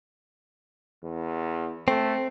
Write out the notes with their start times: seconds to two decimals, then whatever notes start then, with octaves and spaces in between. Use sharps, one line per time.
1.03 E2
1.88 A3 C4